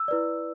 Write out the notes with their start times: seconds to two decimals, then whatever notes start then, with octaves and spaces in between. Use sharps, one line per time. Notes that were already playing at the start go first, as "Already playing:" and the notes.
Already playing: E6
0.08 E4 B4 D5